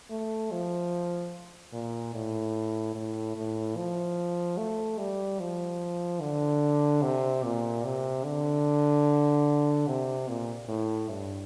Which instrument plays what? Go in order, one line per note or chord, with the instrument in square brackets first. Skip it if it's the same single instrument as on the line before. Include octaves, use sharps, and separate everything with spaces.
[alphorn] A3
F3
A#2
A2
A2
A2
F3
A3
G3
F3
D3
C3
A#2
C3
D3
C3
A#2
A2
G2